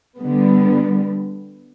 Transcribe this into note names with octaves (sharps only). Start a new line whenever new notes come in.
D3 G3 B3